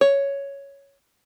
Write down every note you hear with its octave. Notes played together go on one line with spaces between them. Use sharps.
C#5